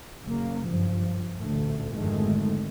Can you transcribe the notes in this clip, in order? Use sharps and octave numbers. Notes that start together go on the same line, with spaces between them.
F#1 C#3 A#3
G2 F3
A1 D2 A#2 D3 A3
G#1 F2 D3 D#3 G#3 A3